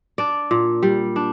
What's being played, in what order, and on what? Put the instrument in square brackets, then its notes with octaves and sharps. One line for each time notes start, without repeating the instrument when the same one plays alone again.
[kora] D4 D5
A#2
G3
D4